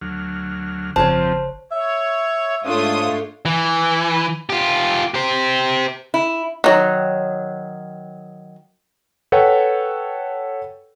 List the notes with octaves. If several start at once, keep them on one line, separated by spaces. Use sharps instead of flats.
D2 F#3 F6
G1 F2 C#3 F3 C4 C5 C#5 A5
C#5 E5
G#2 A3 D4 F4 A4 C#5 D#6
E3
F4 G4
G4 C5
E4
D#3 F#3
A4 B4 C#5 F#5 G5